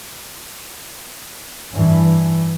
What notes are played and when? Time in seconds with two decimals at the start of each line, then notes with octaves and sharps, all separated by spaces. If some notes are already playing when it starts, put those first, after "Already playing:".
1.73 G2 E3